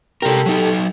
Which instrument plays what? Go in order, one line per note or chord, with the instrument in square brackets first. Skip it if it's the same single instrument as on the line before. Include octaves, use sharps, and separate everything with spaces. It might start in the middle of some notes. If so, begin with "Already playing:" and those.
[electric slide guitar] C3 A#4 [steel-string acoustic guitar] G4 A4
[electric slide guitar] F#3 D#4